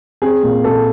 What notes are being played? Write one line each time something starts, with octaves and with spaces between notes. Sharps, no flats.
C4 G#4
A#2
A#2 A4